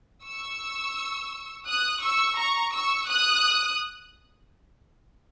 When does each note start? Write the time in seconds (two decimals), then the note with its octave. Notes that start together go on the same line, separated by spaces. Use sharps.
0.26 C#6 E6
1.67 D#6 F#6
2.03 C#6 E6
2.38 A#5 C#6
2.73 C#6 E6
3.09 D#6 F#6